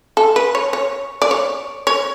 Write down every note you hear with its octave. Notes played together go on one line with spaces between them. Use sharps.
A4
B4
C#5
C#5
D5
C#5
C#5